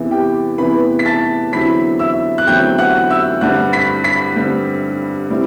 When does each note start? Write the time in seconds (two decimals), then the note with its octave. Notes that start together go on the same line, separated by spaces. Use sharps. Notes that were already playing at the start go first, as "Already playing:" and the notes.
Already playing: E2 C3 E3 B3 E4 E5
0.11 G4 G5
0.58 E2 C3 E3 B3 E4 B4 B5
0.99 B6
1.06 A5 A6
1.52 E2 D3 F#3 C4 E4 B5 B6
1.99 E5 E6
2.38 F#6
2.47 E2 D3 F#3 C4 E4 G5 G6
2.78 F#5 F#6
3.10 E5 E6
3.41 G2 D3 G3 C4 F#5 F#6
3.73 B5 B6
4.04 B5 B6
4.36 G2 D3 G3 C4
5.30 C3 G3 C4 E4